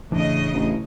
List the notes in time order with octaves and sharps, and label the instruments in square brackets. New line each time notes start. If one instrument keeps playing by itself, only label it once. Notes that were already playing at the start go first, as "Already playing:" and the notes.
[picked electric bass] E1 E3 D4 [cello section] A2 C#3 D#5
[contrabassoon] A1